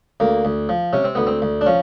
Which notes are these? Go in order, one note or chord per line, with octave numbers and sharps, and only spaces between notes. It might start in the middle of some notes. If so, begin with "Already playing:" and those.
D2 A#3
D2
F3
C3 C#4
C4
D2 B3
C4
D2
D4
F3 C#4